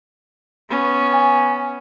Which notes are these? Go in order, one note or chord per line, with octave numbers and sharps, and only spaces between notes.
B3 C#4
G#5